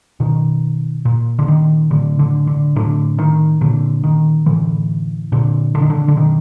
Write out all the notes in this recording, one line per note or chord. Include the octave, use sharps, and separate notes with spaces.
B2 D#3
A#2
D3
D#3
A2 D3
D3
D3
A2 D3
D#3
A#2 D3
D#3
A2 D3 E3
A#2 D3
D3
D#3
D3
D3
B2 D#3